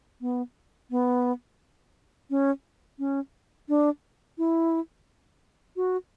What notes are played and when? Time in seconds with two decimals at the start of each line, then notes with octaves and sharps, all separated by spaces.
0.21 B3
0.91 B3
2.30 C#4
2.99 C#4
3.69 D4
4.38 E4
5.76 F#4